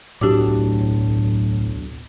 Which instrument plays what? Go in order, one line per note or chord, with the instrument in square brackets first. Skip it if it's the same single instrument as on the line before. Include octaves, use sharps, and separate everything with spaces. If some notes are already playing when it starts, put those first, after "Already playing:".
[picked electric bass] D1 B1 D4 [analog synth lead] A2 [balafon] F#4 G4 D6